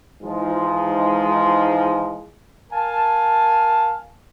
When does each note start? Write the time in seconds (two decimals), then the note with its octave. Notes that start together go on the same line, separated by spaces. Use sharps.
0.22 G#2 E3 F3 G#3 D#4 F4
2.72 A#4 F5 G#5 A5